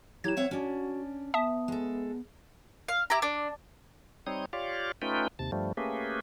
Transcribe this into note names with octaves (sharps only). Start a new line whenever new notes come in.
F#3 E4 G4 G#6 E7
C4 C#5 E5 F#5
C#4 D4 F#4
B3 E5 A5 D#6
G#3 A4
F5
E4 G4 A#5
D4
G3 C4 D#4 C#5 D#6
F4 G4 C#5 D5 F5
A3 C#4 D#4 F4 B4 G5
D#2 C3 A5
G2 F3 G3 A3
A3 A#3 C#4 G4 G#4 B4